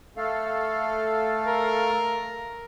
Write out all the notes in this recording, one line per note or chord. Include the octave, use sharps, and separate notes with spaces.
A3 A4 F5
A#4